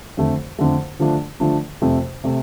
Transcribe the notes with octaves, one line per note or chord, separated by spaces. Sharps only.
F2 D3 A3
F2 D3 A3
D3 F3 A3 D4
D3 F3 A3 D4
F2 C3 A3
C3 A3